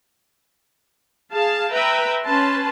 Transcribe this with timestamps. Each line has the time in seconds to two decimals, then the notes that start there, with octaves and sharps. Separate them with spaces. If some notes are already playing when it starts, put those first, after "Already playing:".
1.31 G#4 F5 A5
1.72 B4 E5 G5 A#5
2.24 C#4 B4 A5 C6